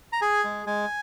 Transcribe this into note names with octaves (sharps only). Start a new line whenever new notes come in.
A#5
G#4 G#5
G#3
G#3 G#5